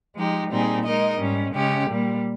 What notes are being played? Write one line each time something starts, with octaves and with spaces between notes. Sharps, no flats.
F3 G#3 D#4 G4
A#2 G3 C4 D#4 G#4
G#3 D#4 A#4 D#5
G#2 G3 C#4
C#3 G#3 C#4 G4
A#2 G3 A#3